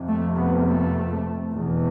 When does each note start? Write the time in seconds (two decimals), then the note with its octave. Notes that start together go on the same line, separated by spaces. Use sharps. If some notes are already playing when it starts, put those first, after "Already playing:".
Already playing: F2 C3
0.08 A3
0.36 B3
0.65 A3
1.51 E2 B2